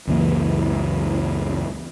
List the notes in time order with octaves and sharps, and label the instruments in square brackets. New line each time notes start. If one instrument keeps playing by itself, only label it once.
[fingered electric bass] C#2 F#2 E3 A#3